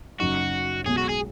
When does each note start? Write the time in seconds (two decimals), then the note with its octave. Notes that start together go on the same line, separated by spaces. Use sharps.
0.19 F#1 F#2 F#3 D#4 F#4
0.86 B1 B2 G#3 G#4
0.98 F#4
1.09 G#4